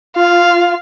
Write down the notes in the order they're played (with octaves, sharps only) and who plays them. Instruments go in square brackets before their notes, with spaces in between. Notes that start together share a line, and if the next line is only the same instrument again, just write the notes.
[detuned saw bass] F4 [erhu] F5